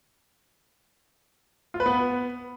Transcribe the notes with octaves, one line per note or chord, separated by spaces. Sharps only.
F4
B4
B3